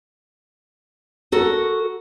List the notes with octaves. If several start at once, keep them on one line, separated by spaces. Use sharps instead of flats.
F#4 A4 A#4